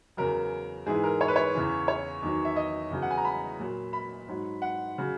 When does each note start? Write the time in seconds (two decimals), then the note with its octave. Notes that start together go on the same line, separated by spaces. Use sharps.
0.17 E2 C#3 F#3 A#4
0.86 G#2 E3 G#4
1.04 A#4
1.21 C#5
1.28 B4
1.36 C#5
1.55 E2 C#3 E3
1.88 C#5
2.22 E2 D#3 F#3
2.45 E5
2.56 D#5
2.91 E2 C#3 F#3
3.02 F#5
3.11 G#5
3.17 A#5
3.25 B5
3.59 A#2 F#3
3.93 B5
4.28 G#2 F#3
4.62 F#5
4.98 C#3 F#3